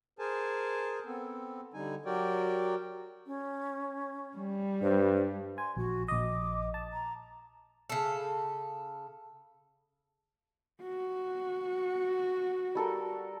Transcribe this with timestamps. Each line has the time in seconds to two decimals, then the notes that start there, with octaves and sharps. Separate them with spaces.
0.19 G#4 A#4 C5 G#5 A5
1.06 B3 C4 A4
1.74 D3 G3 D#4 G#5
2.06 F#3 F#4 G4 A#4 D5 G5
3.27 C#4
4.37 G3
4.82 G2 C5
5.58 G#5 C6
5.77 A#1 F#4
6.08 A#1 D#5 D6
6.74 A5
6.92 A#5
7.89 C#3 A4
10.83 F#4
12.75 G3 A4 A#4